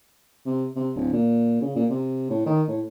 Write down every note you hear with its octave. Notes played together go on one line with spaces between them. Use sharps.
C3
C3
D1
A#2
C#3
A#2
C3
A2
D#3
A2